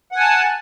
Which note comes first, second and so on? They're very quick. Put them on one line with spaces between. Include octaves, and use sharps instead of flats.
F#5 G#5 A5